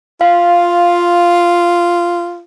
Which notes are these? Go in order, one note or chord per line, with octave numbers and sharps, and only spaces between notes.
F4 F5